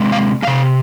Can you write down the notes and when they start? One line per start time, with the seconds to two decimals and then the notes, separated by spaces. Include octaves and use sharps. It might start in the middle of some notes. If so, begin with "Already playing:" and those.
Already playing: C3 G#3
0.12 F5
0.42 C3 G#3 F5